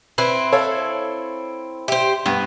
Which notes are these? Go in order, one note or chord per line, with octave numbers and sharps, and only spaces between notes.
C4 E4 B4
A4 C#5 F5
G4 C5 E5
G2 B3